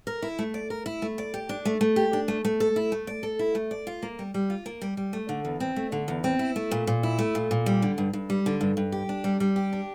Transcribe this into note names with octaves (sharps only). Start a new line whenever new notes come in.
A#4
E4
A3
D5
A#4
E4
A3
D5
G4
D4
A3
A3
G4
D4
A3
A3
A4
E4
A3
D5
A4
E4
A3
D5
F4
A#3
G3
G3
F4
A#3
G3
G3
A3
D3
E2
C4
A3
D3
E2
C4
E4
A3
A#2
A#2
E4
A3
A#2
A#2
G3
D3
G2
G2
G3
D3
G2
G2
G4
D4
G3
G3
G4
D4